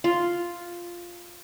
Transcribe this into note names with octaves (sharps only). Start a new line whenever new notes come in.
F4